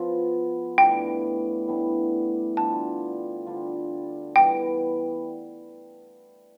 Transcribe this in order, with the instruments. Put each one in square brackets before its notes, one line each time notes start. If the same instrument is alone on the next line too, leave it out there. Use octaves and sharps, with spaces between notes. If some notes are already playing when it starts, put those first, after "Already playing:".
Already playing: [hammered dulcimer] F3 B3 F4
[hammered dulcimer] A2 G3 B3 D4 [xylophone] G5
[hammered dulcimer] A2 G3 B3 D4
[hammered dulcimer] D3 G3 D4 F4 [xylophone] A5
[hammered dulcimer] D3 G3 D4 F4
[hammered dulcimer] E3 G3 B3 [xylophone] G5